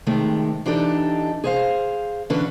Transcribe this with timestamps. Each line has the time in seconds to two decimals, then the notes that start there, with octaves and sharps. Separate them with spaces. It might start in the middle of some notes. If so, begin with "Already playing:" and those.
0.06 C3 D#3 G#3 A3
0.66 E3 D4 D#4 G4 A4
1.44 G#4 C5 F5
2.30 D3 E3 C#4 B4